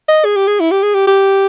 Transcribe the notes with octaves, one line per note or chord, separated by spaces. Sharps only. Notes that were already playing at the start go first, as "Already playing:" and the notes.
D#5
G#4
G4
G#4
E4
G4
G#4
G4
G4